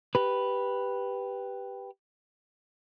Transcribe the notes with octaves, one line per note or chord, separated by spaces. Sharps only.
G4 B4